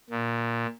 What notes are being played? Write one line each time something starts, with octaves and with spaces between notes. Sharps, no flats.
A#2